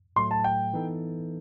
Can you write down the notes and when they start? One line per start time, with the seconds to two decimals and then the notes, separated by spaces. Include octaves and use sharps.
0.16 A2 F#3 A3 C6
0.31 A5
0.44 G5
0.73 E3 B3 D#4 A4